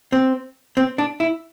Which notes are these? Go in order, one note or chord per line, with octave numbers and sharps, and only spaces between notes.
C4
C4
D4
E4